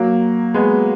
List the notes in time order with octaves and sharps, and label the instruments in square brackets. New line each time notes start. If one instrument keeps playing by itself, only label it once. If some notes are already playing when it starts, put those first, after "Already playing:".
Already playing: [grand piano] F#3 A#3
G#3 B3